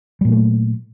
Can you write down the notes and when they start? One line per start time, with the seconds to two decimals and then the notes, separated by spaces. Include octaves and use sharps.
0.21 G3
0.25 A#2
0.28 F#3
0.32 A3